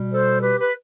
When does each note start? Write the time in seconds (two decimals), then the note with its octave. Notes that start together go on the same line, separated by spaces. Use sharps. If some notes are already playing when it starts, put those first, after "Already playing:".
Already playing: B2 G3
0.12 A4 C5
0.42 G4 B4
0.61 B4